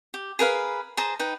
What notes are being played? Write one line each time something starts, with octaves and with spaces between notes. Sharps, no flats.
G4
G#4 A#4 B4 F5
G#4 C5 A5 A#5
D#4 B4 G5